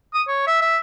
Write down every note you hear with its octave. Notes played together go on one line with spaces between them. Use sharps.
D#6
C#5
E5
E5